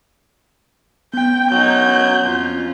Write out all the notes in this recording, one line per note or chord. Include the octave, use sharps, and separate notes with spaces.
B3 C#4 G5
F#3 C#4 D#4 G6
F2 C#4 F4